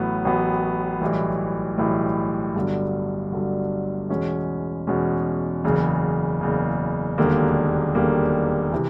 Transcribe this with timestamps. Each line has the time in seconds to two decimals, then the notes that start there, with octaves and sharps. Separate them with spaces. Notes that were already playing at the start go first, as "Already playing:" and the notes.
Already playing: A1 A2 F#3 B3
0.25 A1 A2 F#3 B3
1.01 B1 A2 E3 G3
1.78 B1 A2 E3 G3
2.56 G1 G2 D3 F#3
3.32 G1 G2 D3 F#3
4.09 E2 B2 G#3 C#4
4.87 E2 B2 G#3 C#4
5.64 F#1 E2 C#3
6.41 F#1 E2 C#3
7.18 E1 D#2 D3 G3 A#3
7.95 E1 D#2 D3 G3 A#3
8.72 C3 E3